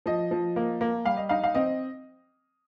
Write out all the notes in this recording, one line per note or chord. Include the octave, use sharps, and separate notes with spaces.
F3 D#5
F3
A#3
A#3
G3 F5
D#5
D#4 F5
F5
C4 D#5